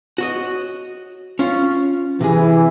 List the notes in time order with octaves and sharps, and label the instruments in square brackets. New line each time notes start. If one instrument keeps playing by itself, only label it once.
[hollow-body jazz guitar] F#4 C#5 D#5
C#4 F4
[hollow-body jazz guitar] C3 G#4 [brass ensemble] E3